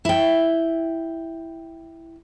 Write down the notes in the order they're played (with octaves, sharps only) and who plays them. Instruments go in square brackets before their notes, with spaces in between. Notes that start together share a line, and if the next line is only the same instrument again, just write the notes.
[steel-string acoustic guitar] E4 G5